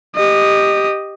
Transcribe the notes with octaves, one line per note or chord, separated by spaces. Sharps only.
G4 D#5